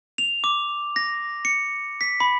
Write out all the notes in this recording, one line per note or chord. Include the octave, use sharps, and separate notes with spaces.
F7
D6
A#6
C#7
B6
B5